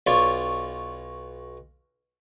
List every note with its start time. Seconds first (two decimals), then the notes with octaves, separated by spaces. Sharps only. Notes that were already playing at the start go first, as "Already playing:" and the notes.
0.07 B1 F4 C#5 D5 C#6